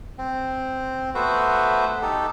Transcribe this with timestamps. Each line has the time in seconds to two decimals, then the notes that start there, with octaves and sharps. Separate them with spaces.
0.18 C4
1.15 A3 B3 F#4 B4 C5 E5
2.02 D#4 G4 A4